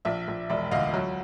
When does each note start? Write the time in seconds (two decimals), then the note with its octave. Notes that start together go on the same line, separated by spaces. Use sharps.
0.05 A#1 D5 E5
0.28 A#1
0.50 E1 D5 E5
0.71 D2 D#5 F5
0.94 F#3